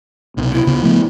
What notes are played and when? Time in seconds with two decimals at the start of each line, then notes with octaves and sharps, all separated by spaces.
0.37 C2 B2
0.53 E4
0.66 C#2 C#3 B3
0.83 F3 A3 B3